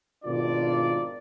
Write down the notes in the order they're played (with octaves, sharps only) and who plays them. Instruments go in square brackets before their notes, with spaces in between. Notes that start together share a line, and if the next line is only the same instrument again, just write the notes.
[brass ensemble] G#1 B2 D#3 D4 F4 D5